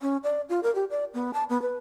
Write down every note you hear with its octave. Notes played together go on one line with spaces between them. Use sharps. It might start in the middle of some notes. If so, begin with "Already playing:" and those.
C#4
D5
F4
A#4
G4
D5
B3
A5
B3
B4